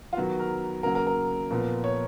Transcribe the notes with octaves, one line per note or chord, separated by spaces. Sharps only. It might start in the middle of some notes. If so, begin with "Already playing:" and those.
F4
D#3 F#3 B3 F#4
A#4
C#3 F#3 A#3 A#4
A#4
A#4
A#2 F3 B3
C#5